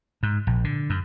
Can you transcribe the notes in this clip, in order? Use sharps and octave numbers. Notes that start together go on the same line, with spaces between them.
G#2
A#1
D3
F#2